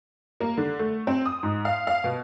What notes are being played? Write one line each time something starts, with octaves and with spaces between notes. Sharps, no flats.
A#3
D3
A3
C4
D#6
G#2
F5
F5
B2